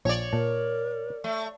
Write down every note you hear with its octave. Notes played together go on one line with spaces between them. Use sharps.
A#1 F3 C#5 D5
A#2 A#4 A5
A3